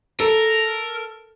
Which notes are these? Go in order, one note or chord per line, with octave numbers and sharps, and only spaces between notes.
A4 A#4